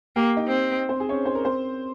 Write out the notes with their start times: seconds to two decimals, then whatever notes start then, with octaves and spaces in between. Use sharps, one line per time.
0.16 A#3 G4 G5
0.37 D#4 D#5
0.47 C4
0.89 C4 C5
1.00 G#4
1.09 C#4 C#5
1.25 C5
1.35 A#4
1.45 C4 C5